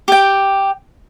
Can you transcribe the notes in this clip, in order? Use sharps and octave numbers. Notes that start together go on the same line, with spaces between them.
G4 G5